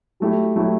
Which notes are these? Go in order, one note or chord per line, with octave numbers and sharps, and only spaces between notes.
F#3 A3 E4 G4
F#3 A3 E4 G4